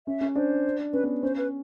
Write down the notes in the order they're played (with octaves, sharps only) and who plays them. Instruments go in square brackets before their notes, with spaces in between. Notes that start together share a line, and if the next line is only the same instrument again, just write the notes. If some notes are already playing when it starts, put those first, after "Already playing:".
[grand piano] C#4 [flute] E5
[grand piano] C#4
[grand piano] D4 [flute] C5
[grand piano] C#4 [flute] B4
[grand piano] B3
[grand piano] C#4 [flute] C5
[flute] B4